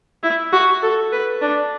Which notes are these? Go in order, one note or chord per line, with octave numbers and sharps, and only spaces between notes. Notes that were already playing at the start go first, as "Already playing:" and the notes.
E4
F#4
A4
B4
D4